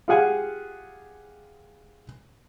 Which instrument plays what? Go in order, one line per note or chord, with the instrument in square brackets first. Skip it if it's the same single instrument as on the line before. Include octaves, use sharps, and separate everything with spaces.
[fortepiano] F4 G4 G#4 F5 F#5 G#5